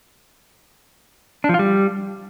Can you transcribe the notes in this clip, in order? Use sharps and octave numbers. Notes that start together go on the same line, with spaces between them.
D4
F3
F4
G3